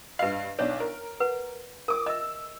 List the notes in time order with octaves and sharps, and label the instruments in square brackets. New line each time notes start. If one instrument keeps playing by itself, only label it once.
[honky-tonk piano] G2 F5 [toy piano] B4 D#5
[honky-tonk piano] B1 D4 [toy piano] C#5
[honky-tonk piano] A#4
[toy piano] B4 F#5
[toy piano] A#4 [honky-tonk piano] D6 D#6
[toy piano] D#5 E5 [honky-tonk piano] E6